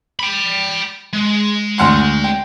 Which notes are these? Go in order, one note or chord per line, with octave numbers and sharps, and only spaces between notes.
G5 B5
G#3
D2 F#5 C6
G5